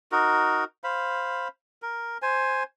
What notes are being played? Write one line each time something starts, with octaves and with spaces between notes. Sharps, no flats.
D#4 F#4 A#4
C5 F5 B5
A#4
C5 G#5